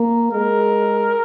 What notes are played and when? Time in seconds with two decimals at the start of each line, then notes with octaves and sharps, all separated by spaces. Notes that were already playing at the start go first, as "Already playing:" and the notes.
Already playing: A#3
0.33 G#3 A#4